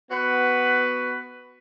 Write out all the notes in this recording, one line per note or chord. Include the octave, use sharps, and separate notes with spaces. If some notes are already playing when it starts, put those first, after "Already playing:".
B3 F#4 B4